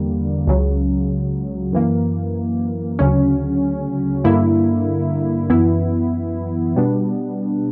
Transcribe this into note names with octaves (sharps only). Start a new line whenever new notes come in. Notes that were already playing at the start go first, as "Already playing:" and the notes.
Already playing: E2 D3 G3 A#3
C#2 C#3 F#3
F#2 E3 A#3
D2 C#3 F#3 C#4
G2 D3 A#3 E4
F#2 E3 B3 E4
B2 G3 B3 D4